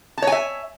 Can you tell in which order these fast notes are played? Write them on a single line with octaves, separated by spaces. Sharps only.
A5 C#5 G#5 E5